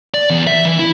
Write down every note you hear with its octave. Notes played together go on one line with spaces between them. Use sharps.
D5
E2
E5
E3
E4